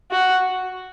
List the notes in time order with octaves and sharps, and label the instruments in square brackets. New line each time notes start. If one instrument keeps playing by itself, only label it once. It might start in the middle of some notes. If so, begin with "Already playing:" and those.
[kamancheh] F#4